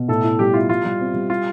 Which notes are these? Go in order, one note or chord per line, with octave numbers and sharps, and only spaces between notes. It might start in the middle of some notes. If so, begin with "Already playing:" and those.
Already playing: B2
A2 A4
E4
G3 G4
E4 F4
G3 F4
G3
C4
G3
F4 G4